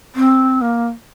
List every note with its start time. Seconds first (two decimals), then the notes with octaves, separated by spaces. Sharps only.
0.15 C4
0.61 A#3